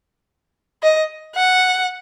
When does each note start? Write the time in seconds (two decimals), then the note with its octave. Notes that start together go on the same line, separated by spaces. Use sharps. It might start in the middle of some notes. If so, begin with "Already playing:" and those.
0.83 D#5
1.35 F#5